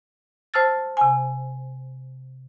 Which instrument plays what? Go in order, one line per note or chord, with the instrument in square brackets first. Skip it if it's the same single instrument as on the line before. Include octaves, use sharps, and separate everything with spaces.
[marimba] C5 A5 E6 F6 A6
C3 G#5